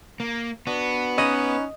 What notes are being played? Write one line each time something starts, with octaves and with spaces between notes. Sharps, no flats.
A#3
B3 D4 F#4
C#4 D#4 D#5 B5 F#6